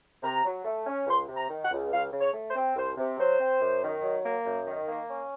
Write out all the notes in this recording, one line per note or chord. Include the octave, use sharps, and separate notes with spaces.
C3 A#5
F#3
A3
C#4
C#2 C6
C3
A#5
D#3
F#5
C#2
C#2 F5
C#3
C#5
A3
C5
C4
C2 C5
C3
F#3 C5
C4
F#2
D#3
F#3
A#3
F#2
D#3
A#3
C#4